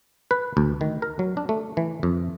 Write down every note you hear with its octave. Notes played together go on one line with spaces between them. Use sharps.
B4
D2
D#3
A#4
F#3
D4
A3
E3
F2